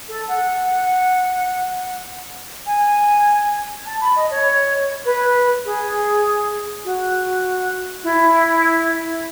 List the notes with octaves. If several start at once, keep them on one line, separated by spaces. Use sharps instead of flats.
A4
F#5
G#5
A5
B5
D#5
C#5
B4
G#4
F#4
E4